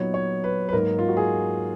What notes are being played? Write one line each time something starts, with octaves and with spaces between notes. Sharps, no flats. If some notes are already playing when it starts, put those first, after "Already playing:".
Already playing: A#2 F#3 B3 D#4 C#5
C#5
B4
B4
G#2 F#3 A#3 D#4 A#4
F4
F#4
G#4